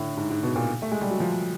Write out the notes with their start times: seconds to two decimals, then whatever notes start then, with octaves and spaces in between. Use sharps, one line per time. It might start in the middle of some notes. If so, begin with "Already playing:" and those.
Already playing: A2 D3
0.17 G#2
0.30 G#2
0.43 B2
0.56 A#2
0.82 A3
0.92 G#3
1.01 G3
1.11 F#3
1.20 F3